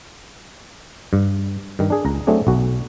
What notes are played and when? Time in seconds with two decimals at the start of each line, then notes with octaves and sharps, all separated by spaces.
1.13 G2
1.79 G2 D#3
1.90 D4 G#4
2.05 C#2 A#5
2.27 F#3 A3 C4 D4 G#4
2.47 B1 F#4